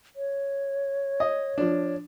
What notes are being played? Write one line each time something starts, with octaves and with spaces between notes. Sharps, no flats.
C#5
D#5
F3 D4